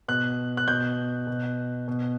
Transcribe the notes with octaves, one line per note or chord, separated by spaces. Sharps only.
B2 F#6
F#6
B2 G6
B2
B2